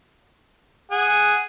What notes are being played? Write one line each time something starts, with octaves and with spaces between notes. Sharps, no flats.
G#4 F#5